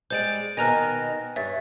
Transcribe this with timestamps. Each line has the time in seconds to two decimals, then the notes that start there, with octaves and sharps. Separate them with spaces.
0.10 G3 G#3 C5 G6 A6 D7
0.57 B2 D#3 D#5 G#5 A#5 F6 F#6 A#6
1.36 G2 C#5 E5 A6